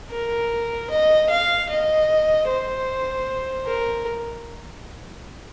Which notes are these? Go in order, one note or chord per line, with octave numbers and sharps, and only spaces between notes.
A#4
D#5
F5
D#5
C5
A#4